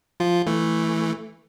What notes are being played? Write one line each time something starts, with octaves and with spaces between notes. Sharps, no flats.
F3 F4
E3 A3